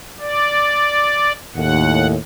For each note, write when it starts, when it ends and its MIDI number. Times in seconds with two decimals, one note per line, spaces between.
0.20 1.32 74
1.56 2.17 39
1.56 2.17 45
1.56 2.07 78